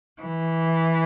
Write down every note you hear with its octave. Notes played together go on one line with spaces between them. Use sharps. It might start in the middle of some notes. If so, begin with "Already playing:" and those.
E3